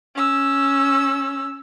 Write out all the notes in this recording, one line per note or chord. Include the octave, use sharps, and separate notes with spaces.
C#4 E6